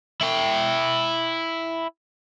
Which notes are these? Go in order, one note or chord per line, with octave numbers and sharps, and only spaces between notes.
E4 G5